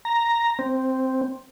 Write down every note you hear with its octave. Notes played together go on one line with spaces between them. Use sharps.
A#5
C4